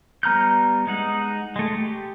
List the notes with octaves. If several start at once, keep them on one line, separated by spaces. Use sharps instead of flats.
G3 B3 A#5 F6 G6
G#3 D#4 F#5
G#3 A3
G4